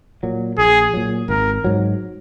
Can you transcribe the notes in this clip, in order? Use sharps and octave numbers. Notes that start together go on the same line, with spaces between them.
A#2 F#3
A#1 G#4
A#2 F#3
G#1 A#4
G#2 F#3